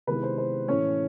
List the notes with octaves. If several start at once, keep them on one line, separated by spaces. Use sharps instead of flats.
C3 D#3 G#3 B3 E4 B4
C5
C5
A2 E3 A3 C#4 C#5